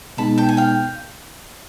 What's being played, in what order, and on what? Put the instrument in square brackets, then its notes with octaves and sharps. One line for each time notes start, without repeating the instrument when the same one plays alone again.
[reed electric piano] B2 G#3 B3 D#4 [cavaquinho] A5 B5
[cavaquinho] G5 A5
G#5
F5 G5